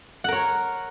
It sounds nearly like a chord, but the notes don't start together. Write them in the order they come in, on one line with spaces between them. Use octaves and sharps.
F#5 A#4 C#5